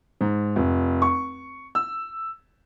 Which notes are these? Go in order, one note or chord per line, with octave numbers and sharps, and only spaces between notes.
G#2
F1
C#6
E6